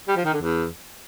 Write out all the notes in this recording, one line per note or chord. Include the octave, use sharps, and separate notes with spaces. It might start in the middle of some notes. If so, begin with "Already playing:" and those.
G3
F3
D#3
D3
E2